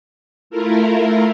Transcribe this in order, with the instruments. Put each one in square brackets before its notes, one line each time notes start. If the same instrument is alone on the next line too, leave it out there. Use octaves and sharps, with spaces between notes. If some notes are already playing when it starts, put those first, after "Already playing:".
[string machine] A3 E4 F4 A#4